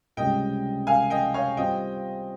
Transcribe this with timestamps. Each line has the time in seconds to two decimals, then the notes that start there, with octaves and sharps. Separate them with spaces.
0.17 C#2 C3 G3 C#4 D#5 G5
0.87 F5 G#5
1.10 D#5 G5
1.34 C#5 F5
1.57 G3 C4 F4 D#5 G5